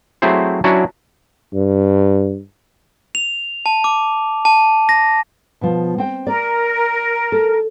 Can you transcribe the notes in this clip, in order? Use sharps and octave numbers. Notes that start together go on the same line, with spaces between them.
F#3 A3 C4 E4 G#4 C5
F#3 C#4 D4 E4 F#4
G2
F7
A5
D6
A5
A#6
B2 F3
C4 G5
A#4 D5
A4